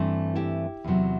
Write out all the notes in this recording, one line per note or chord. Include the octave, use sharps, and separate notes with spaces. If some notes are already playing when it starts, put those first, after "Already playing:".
Already playing: G2 E3 A3 C4
E4 G4
E2 C3 F#3